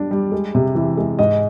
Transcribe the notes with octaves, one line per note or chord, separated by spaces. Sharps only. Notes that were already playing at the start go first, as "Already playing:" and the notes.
Already playing: G3 D4
G3
G#3
C3
E3
G#3
G#2 D#5